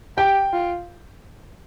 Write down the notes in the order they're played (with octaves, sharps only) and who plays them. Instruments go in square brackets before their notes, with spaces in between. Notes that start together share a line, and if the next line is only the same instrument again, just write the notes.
[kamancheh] G4 [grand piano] G5
[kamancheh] F4